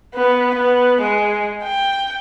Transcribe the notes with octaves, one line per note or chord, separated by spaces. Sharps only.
B3 B4
B3
G#3
G5